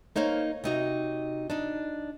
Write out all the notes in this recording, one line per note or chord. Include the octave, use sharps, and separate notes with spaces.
A#3 D#4 C5 C#5 F5
C3 D#4 F#4
D4 D#4